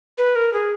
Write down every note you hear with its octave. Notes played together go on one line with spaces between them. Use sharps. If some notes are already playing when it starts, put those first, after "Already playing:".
B4
A#4
G#4